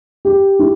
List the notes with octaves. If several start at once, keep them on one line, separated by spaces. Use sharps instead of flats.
G4
E4